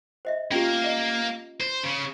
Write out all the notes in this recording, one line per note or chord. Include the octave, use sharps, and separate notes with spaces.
C5 D#5 E5
A#3 C#4 F4 G4 A#4
D5 D#5
C5
C#3